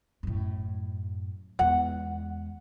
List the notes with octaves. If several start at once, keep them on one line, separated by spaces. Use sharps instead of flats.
F#2 A2
E2 G#3 F#5